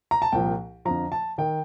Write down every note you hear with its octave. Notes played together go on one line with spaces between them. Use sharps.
A#5
A5
C2 A#2 F3 G5
F2 D3 F3 A#5
A5
D#3 G5